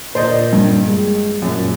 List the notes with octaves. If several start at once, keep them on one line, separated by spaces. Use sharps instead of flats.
A#2 C5 D5 D#5
G2
G#3
F#2 A#2